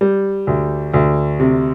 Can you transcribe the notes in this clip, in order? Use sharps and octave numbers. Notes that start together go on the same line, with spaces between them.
G3
D2
D2
C3